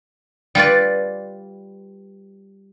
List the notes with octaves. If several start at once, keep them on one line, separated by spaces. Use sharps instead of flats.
G3 F4 B4 D5